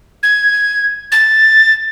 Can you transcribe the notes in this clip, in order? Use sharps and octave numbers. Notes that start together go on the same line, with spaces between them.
G#6
A6